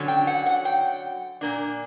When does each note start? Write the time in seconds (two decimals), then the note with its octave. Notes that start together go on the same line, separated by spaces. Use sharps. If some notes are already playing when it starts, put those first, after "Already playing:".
Already playing: D3 F#3 C#4
0.08 G5
0.27 F#5
0.46 F#5
0.65 G5
1.41 A#2 A#3 D4